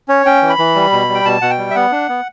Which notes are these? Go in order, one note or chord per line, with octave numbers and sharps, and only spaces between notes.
C#4 C#5
C#4 G5
E3
B5
E3
G3
B2
G3
G5
B2 A5
B2 F#5
G5
G3
E5
B3 F#5
D4
B3